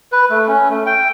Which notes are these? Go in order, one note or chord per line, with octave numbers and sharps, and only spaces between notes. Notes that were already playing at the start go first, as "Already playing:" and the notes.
B4
A3
C#4
A3
G5